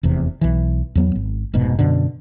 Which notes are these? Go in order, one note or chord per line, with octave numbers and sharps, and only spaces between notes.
F1 E2 C3
B1 E3
E2 F#3 B3
G#1
F1 G#2 B2
F#2 B2 D3